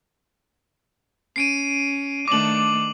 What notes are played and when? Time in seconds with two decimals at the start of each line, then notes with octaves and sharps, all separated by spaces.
1.36 C#4 C7 D7 D#7
2.28 D#3 A3 D4 D6 F#7